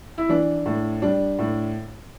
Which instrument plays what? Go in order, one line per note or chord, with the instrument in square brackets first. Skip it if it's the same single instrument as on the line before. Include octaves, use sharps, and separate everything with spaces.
[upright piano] E4
E3 D4
A2
G3 D4
A2